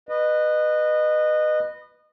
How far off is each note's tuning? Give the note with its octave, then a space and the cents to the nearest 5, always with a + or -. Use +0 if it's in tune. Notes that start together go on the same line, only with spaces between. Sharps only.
B4 +0 D#5 -25